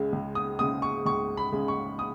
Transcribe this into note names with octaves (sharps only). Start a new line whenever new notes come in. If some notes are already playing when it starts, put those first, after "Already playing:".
Already playing: C#2 C#3 G#3
C#2
D#6
C#3 G#3 D#6
C#6
C#2 C#6
B5
C#3 G#3
C#6
D#6